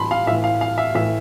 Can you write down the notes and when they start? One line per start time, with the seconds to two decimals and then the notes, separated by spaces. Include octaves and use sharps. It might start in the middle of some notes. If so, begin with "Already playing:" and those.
Already playing: A2 E3 A5 B5 C6
0.11 F5
0.27 A2 E5
0.31 E3
0.44 F5
0.61 F5
0.78 E5
0.95 A2 E3 E5